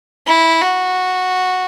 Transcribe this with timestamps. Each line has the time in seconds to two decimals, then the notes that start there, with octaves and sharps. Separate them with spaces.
0.27 E4
0.62 F#4